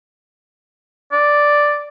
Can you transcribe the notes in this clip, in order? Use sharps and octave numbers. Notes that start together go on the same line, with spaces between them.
D5